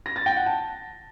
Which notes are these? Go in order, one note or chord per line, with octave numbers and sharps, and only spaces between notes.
A#6
A6
G5
F#5
A5